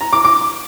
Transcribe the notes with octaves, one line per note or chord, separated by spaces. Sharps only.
A#5
D6
D6